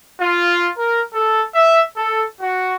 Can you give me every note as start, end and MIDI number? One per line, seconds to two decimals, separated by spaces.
0.21 0.68 65
0.77 1.00 70
1.14 1.43 69
1.55 1.80 76
1.96 2.23 69
2.40 2.75 66